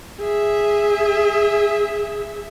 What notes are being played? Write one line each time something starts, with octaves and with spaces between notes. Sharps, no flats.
G#4 E5